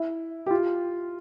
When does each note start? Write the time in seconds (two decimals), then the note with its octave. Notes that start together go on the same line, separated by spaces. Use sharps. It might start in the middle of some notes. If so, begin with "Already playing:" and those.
Already playing: E4
0.46 G4
0.51 F4